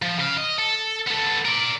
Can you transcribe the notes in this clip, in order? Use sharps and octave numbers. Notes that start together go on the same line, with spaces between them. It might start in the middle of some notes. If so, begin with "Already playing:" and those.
F3
C#3 F5
D#5
A4
B3 A4
A#4 D5